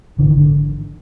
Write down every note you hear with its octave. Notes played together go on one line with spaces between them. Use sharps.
G#1 D3 E3
D#3
D3